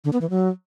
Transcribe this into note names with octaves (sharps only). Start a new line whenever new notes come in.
D3
B3
E3
F#3